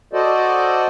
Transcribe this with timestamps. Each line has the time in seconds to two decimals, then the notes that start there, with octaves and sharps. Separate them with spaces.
0.13 F#4 A4 C5 D5 D#5